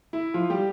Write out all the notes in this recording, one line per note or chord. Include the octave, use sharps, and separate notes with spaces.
E4
F3 F4
G3 G4